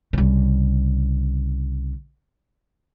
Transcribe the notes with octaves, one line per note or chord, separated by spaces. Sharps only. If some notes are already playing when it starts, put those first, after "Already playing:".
C2 C#3